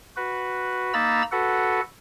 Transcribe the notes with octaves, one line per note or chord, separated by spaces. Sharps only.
F#4 B4
A#3 D#4 A#5 B5 E6 A6
F#4 A4 B4 F#5